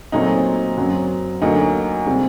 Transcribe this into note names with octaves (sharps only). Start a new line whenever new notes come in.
A#2 F#3 A3 C4 D#4
F#2 F#3 C4
D2 D3 F#3 A#3 D#4
C3 G3 C4